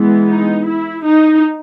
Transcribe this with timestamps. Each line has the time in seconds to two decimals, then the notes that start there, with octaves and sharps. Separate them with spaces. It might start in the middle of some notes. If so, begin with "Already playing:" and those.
Already playing: E3 G#3 B3
0.28 D#4
0.66 E4
1.04 D#4